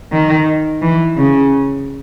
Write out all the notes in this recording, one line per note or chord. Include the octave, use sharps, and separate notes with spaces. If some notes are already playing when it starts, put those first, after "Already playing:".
D#3
E3
C#3